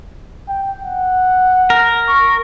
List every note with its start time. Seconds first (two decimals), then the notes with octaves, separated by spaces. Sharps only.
0.49 G5
0.83 F#5
1.70 A#4
2.08 C#6